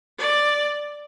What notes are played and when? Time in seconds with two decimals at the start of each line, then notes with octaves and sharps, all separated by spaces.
0.19 D5